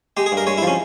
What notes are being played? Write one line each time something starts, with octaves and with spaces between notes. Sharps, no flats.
G#3 G4
G#4
G2
A#4
G#3 C#5
E4
F3 C#4